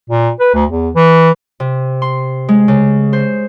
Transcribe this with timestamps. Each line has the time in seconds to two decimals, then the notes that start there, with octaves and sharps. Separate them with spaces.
0.10 A#2
0.40 B4
0.54 D2
0.70 E2
0.95 E3
1.60 C3
2.02 C6
2.49 G#3
2.68 C#3
3.13 C5